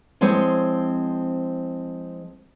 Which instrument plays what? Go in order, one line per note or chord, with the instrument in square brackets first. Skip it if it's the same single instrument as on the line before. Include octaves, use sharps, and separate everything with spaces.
[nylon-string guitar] F3 G#3 C4 E4 C5 C#5